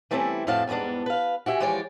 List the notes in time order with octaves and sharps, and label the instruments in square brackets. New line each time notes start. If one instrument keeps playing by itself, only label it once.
[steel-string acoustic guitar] E3 G3 A3 C4 C#4 E4
F2 A2 C4 F#4 F5 A5
E2 G#2 G3 B3 D4
B4 F5
F#4 G4 E5 G#5
E3 F3 G#3 G4 C#5 D5